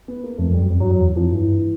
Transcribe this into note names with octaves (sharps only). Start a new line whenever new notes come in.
B3
A#3
F2 A3
F2
G3
F#2
F2
G2 F#3
F#2 F#3
E2
F2 F3
G2 E3
G2